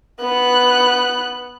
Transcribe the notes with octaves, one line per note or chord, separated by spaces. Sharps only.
B3 F#6